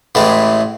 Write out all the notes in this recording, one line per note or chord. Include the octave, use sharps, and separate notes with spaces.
A1 A2 E3 G#3